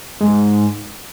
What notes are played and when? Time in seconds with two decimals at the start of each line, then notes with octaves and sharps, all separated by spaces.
0.21 G#2